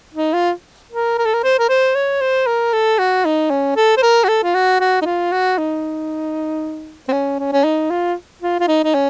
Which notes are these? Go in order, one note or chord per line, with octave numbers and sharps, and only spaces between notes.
D#4
F4
A#4
A#4
A4
A#4
C5
A#4
C5
C#5
C5
A#4
A4
F#4
D#4
C#4
A4
C5
A#4
F#4
A4
F4
F#4
F#4
D#4
F4
F#4
D#4
C4
C#4
C#4
C#4
D#4
F4
F4
F4
D#4
D#4
C#4